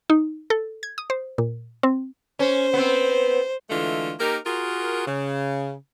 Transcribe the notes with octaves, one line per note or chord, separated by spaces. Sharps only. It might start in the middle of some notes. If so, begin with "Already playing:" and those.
D#4
A4
G#6
D#6
C5
A#2
C4
C#4 C5
B3 C4
D3 E3 G#3 A3 F4
A#3 D#4 G4 A#4
F4 F#4 G#4 A#4
C#3